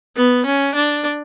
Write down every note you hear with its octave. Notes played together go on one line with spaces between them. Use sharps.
B3
C#4
D4